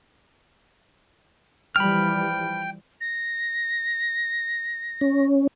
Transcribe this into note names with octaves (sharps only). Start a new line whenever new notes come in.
E3 F3 G3 G5 B5 F6
A#6
C#4